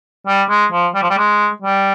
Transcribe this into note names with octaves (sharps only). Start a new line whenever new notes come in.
G3
G#3
F3
G3
F3
G3
G#3
G3